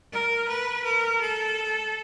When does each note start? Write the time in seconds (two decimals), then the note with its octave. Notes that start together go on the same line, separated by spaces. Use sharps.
0.13 A#4
0.48 B4
0.84 A#4
1.21 A4